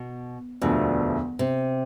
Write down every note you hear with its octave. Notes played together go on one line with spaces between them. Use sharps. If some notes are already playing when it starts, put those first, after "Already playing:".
Already playing: B2
E1 D2 B2 D3 F3 A3
C3